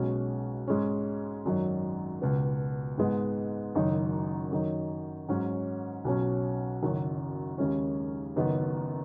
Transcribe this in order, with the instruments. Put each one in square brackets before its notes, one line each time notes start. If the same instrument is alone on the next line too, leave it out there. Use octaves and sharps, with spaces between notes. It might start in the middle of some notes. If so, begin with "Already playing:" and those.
Already playing: [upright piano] B1 B2 G#3 C#4
G#2 G#3 C#4
G#1 F#2 F#3 D#4
C#2 B2 B3
G#2 G#3 B3 D#4
F#1 F#2 D#3 F#3 D#4
F#2 D#3 F#3 D#4
G#2 F#3 C#4
B1 B2 F#3 C#4
F#1 F#2 D#3 F#3
D#2 C#3 G#3 C#4
F#1 F#2 D#3 B3 D#4